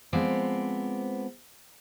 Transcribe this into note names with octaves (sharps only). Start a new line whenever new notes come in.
F3 G#3 B3 C4 D5